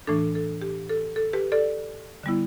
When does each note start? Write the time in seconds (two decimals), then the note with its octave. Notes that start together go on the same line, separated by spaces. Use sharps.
0.07 A2 E3 A3 D4 A4
0.35 A4
0.62 G4
0.89 A4
1.16 A4
1.33 G4 B4
1.52 A4 D5
2.23 D3 G3 B3 E4